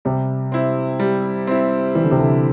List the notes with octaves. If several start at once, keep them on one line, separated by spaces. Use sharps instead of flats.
C3 G3
C4 E4
G3
C4 E4
E3 G3
D3
C3
D3